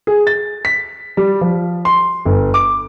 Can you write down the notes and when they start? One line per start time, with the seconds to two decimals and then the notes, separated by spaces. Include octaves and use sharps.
0.07 G#4
0.27 A6
0.65 B6
1.17 G3
1.41 F3
1.85 C6
2.25 G1
2.54 D6